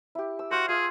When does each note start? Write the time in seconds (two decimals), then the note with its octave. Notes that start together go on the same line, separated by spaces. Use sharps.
0.15 E4 G4
0.39 E6
0.51 F#4 C5 F5
0.69 F4 G#4 E5